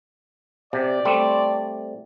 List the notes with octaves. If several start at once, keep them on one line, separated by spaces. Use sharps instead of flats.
C3 D5
G3 A3 C4